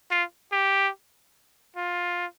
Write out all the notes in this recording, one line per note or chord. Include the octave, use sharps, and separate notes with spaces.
F4
G4
F4